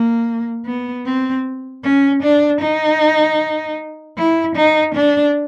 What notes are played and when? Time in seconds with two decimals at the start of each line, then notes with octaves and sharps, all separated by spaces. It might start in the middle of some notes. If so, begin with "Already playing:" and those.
Already playing: A#3
0.66 B3
1.06 C4
1.84 C#4
2.23 D4
2.61 D#4
4.17 E4
4.56 D#4
4.95 D4